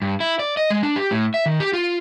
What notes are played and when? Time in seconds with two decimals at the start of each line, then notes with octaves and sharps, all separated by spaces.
0.02 G2
0.20 E4
0.39 D5
0.57 D#5
0.70 G#3
0.83 D4
0.96 G4
1.11 A2
1.34 E5
1.46 D#3
1.60 G4
1.73 F4